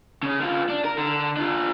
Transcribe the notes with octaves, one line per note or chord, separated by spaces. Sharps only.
C#3 C#4
D3 F4
D4
A#4
D3
D4 F4